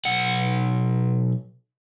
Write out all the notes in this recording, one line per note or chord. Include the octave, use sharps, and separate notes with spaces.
B1 F#5